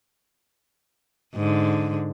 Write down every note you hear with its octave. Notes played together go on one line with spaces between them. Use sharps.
G#2 D3